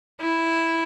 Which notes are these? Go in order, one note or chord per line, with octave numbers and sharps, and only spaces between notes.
E4